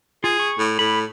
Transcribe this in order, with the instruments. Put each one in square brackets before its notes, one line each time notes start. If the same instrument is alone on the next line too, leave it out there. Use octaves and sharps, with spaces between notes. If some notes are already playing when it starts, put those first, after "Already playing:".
[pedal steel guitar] F4 [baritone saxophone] G#4
[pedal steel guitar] C#6
[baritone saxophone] A2
[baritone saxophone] A2 [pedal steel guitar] B5